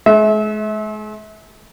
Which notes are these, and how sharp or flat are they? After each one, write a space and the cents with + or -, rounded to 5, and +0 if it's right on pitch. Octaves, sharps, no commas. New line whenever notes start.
G#3 +40 E5 -30